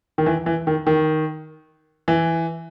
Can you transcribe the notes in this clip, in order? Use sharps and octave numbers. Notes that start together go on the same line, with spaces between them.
D#3
E3
E3
D#3
D#3
E3